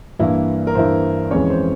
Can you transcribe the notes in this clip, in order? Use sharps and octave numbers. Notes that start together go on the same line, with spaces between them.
G2 E3 A#3 E4
A#4
G2 E3 A#3 E4 C5
F2 E3 G#3 C#4 C#5
C5